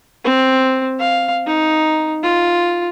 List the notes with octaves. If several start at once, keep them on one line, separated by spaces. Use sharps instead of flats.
C4
F5
D#4
F4